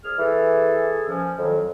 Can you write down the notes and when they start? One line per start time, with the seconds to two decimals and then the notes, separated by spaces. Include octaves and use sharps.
0.04 C2 G#4 F6
0.19 E3 G#4 A4
1.07 A#2 F3 C#4
1.38 F2 A2 D#3 F#3